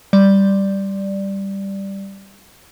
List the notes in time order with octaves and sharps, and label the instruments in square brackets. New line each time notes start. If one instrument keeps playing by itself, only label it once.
[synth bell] G3 D5